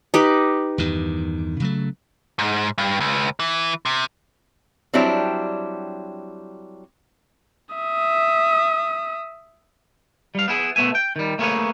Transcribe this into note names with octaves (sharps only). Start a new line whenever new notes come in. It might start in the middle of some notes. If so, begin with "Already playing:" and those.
D#4 G4 B4
E2 G2 D#3
C#3 F#3 A3
G#2
G2
C#2
E3
C3
F#3 G3 C4 D4 E4
E5 D#6
G3 F5
B3 E4 G#4
B2 A3 B3 E5 G#5
G5
D#3 G3
A3 A#3 C#4 G#4 B4 C#5